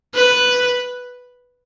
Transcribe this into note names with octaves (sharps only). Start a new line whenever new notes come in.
B4